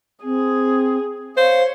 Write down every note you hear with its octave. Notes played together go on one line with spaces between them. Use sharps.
C4 G#4
C5 C#5 F5